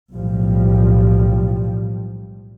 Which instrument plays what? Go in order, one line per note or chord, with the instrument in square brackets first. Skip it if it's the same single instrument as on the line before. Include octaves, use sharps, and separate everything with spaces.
[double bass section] B1 A2 F3 G3